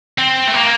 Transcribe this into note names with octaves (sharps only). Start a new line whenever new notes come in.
C4
A3
A#3